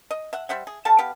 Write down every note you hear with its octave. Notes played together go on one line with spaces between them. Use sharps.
D#5
E5 F#5
G3 C5 E5 F#5
G#4
G3 A4 F5 A5
B3 G4 F5